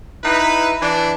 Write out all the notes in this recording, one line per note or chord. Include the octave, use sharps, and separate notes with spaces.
D#4 E4 B4
E3 D4